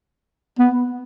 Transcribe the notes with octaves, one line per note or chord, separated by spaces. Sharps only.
B3